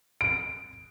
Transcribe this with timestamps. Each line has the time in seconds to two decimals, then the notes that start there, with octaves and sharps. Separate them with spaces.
0.21 D7